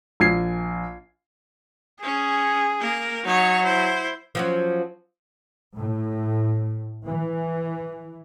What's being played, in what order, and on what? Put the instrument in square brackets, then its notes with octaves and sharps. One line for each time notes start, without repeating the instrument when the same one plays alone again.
[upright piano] A#1 G#6 C7
[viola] C#4 [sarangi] G#4
[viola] A#3 A#4
[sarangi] F#3 [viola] D#4 C#5
[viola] E4 C5
[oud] F3 F#3 C#4
[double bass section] A2
E3